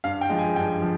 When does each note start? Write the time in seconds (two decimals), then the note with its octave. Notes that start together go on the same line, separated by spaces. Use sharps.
0.04 G2 F5
0.21 G5
0.29 F3 G#3
0.39 G#5
0.56 G2 G5
0.82 F3